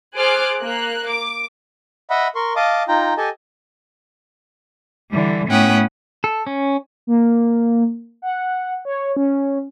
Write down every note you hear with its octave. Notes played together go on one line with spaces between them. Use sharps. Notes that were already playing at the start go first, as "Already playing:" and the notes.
G#4 C5 D6 F6 F#6 A6
A#3 F#6
D6
D#5 E5 F#5 B5
A#4 C6 C#6
D#5 F5 A5 D6 D#6
D#4 F4 G5 A#5
G4 A4 D#5 G#5 A5
D3 E3 G3
A2 B3 C#4 F#5 G5 D#6
A4
C#4
A#3
F#5
C#5
C#4